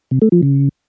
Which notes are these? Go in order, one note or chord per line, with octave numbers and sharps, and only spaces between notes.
C3
A3
F3
C#3